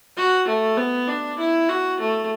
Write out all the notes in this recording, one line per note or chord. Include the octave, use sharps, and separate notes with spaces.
F#4
A3
B3
D4
E4
F#4
A3